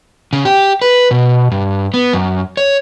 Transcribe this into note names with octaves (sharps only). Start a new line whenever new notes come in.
C#3
G4
B4
B2
G2
B3
F#2
C#5